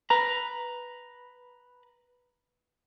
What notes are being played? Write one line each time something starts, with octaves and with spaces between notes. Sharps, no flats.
B4 A#5